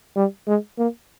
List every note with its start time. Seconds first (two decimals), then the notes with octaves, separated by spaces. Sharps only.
0.16 G3
0.47 G#3
0.78 A#3